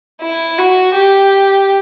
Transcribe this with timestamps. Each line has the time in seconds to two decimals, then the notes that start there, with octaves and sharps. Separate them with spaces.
0.22 E4
0.58 F#4
0.95 G4